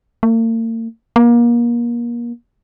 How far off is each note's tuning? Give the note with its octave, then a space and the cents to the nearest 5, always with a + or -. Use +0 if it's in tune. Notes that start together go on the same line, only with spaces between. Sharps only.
A#3 -45
A#3 +30